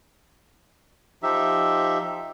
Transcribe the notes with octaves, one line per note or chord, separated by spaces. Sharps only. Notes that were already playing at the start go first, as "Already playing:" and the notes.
F3 D#4 G4 E5